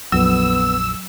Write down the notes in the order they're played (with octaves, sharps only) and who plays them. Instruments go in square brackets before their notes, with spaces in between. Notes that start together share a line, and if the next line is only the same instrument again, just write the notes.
[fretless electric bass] A#1 F2 A#2 [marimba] F#3 [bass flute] B3 [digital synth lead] E6